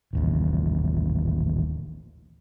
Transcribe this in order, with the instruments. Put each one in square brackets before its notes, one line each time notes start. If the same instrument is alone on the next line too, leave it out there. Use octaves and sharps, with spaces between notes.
[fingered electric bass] D#1 A1 D#2